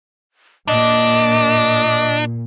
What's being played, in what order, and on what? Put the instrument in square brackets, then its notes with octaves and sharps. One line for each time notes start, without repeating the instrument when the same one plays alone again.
[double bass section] A#2 [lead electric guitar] D4 [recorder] D#5 [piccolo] D6